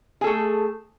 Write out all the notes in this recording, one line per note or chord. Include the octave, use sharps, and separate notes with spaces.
A3 G#4 A4